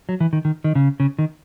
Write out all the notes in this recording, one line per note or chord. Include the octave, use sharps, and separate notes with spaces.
F#3
E3
D#3
D#3
D#3
C#3
C#3
D#3